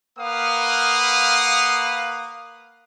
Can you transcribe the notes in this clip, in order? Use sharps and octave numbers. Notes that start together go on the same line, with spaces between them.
A#3 B4 F5 F#5 D#6